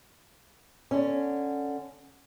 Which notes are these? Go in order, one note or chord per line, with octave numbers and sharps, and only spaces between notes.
D3 C#4